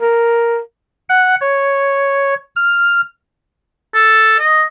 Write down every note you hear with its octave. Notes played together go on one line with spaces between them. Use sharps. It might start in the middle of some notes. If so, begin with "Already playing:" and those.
A#4
F#5
C#5
F6
A4
D#5